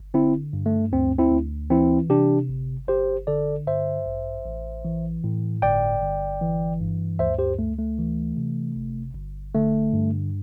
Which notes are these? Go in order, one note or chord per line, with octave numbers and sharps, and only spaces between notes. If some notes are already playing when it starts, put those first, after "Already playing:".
Already playing: G1
D3 C4 E4
G2
A3
D2 C4
C4 E4
D2
E3 C4 E4
C3 D4 G4
G1
G1 G4 C5
D3 A4 D5
G2 C5 E5
A1
A1
E3
A2
G1 D5 G5
G1
E3
G2
D2 C5 E5
G4 C5
D2 A3
A3
E3
C3
G1
G1
D3 A3
G2